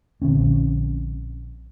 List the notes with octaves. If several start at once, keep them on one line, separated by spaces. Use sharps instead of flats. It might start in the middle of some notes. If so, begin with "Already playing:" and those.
A#1 D3 C4 C#4